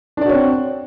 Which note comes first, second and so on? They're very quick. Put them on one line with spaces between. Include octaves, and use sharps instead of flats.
D4 D5 F#4 C#5 C4